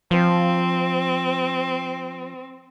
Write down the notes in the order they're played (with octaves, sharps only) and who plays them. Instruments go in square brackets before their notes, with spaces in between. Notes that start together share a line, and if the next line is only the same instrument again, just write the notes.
[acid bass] F3 [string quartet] C4